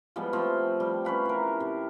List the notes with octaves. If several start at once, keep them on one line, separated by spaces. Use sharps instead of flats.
F3 G3 G#3 B3
F3 A3 C4
G3
C#4 G4 B4 F5
E4 A#4
C3